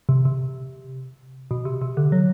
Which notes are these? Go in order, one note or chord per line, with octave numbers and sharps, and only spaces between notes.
C3
C3
B2
C3
C3
D3
F#3